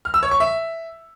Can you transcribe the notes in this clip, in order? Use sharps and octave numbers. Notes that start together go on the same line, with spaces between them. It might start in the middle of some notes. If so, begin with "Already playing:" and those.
F6
E6
C#5
C#6
E5